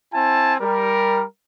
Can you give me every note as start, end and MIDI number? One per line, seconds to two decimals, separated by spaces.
0.13 0.55 60
0.13 0.55 64
0.13 0.55 80
0.13 0.55 81
0.60 1.24 55
0.60 1.24 70